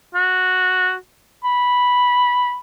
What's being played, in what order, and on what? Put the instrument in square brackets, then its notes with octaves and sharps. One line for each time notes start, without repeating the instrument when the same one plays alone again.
[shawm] F#4
B5